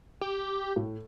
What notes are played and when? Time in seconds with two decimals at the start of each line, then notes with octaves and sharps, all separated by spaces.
0.21 G4
0.76 A2